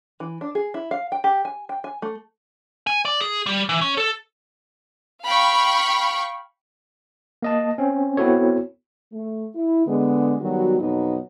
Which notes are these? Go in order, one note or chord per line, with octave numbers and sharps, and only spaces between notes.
E3
D4
G#4
E4
F5
G5
G4
G#5
G5
G#5
A3
G#5
D5
G#4
G3
E3
C#4
A4
F5 G5 B5 C#6
A#3 D#5 A5
C4 C#4
B3 C4 E4 F#4 A4 C#5
A3
E4
D3 G#3 B3
D#3 F#3 G3 B3 D#4 F#4
F2 B2 F#3 B3 D#4